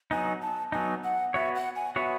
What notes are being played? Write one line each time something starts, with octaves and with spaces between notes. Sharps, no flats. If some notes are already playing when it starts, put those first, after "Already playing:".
F#3 B3 D#4 G#5
A5
F#3 B3 D#4 G#5
F#5
B3 F#4 C#5 E5
F#5
G#5
B3 F#4 C#5 E5